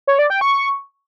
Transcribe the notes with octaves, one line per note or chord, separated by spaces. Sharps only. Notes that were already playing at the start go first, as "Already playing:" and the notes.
C#5
D5
G5
C#6